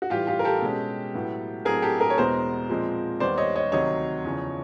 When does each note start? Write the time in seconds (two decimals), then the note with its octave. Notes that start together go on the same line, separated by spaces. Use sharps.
0.02 F#4
0.10 A2 E3 G3 F4 G4
0.27 F4 G4
0.39 A#4
0.44 G4 A4
0.62 B2 G#3 C#4
1.14 A2 F#3 B3
1.65 A2 F#3 A3 C4 G#4 A#4
1.82 G4 A4
2.00 G#4 A#4
2.10 C#5
2.18 E2 B2 G#3 B3 A#4 C5
2.69 A#2 F3 G#3 C4
3.20 D#2 D#3 G3 B3 C5 D5
3.38 C#5 D#5
3.55 C#5 D#5
3.72 D2 C3 D#3 F#3 C#5 D#5
4.24 E2 C#3 F3